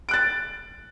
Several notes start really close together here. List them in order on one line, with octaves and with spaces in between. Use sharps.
D7 F#6 A6